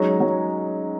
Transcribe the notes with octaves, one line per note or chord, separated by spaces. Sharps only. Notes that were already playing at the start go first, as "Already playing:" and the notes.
Already playing: F#3 G#3 C#4 D#4
F#3